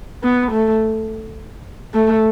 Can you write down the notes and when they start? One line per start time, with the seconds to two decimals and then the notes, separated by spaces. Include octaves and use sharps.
0.23 B3
0.52 A3
1.94 A3